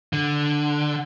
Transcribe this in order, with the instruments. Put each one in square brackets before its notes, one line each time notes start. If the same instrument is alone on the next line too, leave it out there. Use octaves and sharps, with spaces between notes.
[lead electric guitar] D3